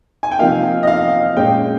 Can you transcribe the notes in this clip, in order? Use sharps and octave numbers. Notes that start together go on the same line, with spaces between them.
G#5
G5
C3 F3 A#3 D#4 F5
D#5
F5
A#2 G#3 C#4 G5